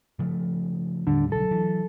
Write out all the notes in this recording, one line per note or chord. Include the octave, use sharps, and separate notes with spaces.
C#3 F3 A3
D#2 A2 D3 G3
B1 D3 F#3 A4
E3